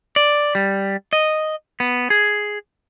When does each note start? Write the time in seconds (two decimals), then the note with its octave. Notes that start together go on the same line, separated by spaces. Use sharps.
0.16 D5
0.55 G3
1.13 D#5
1.80 B3
2.10 G#4